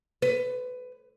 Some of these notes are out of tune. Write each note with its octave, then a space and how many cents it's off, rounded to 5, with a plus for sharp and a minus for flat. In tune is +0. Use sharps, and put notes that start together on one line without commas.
B4 +20